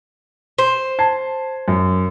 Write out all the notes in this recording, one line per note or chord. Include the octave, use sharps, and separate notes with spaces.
C5
A5 G#6 C7
F#2